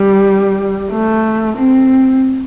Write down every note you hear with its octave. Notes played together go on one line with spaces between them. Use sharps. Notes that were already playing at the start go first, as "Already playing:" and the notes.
Already playing: G3
A3
C4